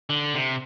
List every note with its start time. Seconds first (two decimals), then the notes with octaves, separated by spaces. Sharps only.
0.10 D3
0.34 C3